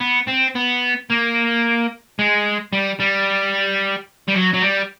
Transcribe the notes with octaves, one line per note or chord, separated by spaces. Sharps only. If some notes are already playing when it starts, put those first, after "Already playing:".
B3
C4
B3
A#3
G#3
G3
G3
G3
F#3
F#3
G3